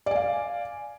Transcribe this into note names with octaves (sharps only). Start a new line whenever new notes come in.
D5 F5 G#5